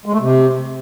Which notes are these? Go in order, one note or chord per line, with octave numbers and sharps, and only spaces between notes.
G#3
A3
C3